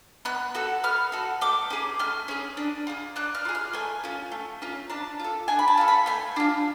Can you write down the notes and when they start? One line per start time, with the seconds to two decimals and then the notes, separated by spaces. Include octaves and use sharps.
0.25 B3 F#6
0.55 F#4 A4
0.84 B3 F6
1.12 F#4 A4
1.41 A3 D6
1.70 C#4 G#4
1.99 A3 F6
2.28 C#4 G#4
2.57 D4
2.87 F4 G#4
3.16 D4 F#6
3.35 F6
3.45 F4 G#4
3.55 F6
3.73 A3 G#5
4.04 C#4 F4
4.32 A3
4.62 C#4 F4
4.90 D4 A5
5.20 F4 A4
5.48 D4 G#5
5.59 B5
5.68 A5
5.78 F4 A4
5.88 B5
6.06 A3 G#5
6.36 D4 F4